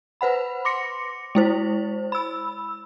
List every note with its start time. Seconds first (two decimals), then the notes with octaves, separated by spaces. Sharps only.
0.21 B4 C5 F#5 B5
0.65 C6 D6 A#6 C#7
1.35 G#3 E4 C5
2.12 B5 E6